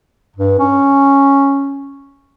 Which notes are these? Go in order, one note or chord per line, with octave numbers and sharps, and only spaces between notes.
G2
C#4